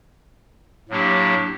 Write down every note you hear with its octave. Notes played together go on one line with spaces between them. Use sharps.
A2 F#3 A#3 D4 G4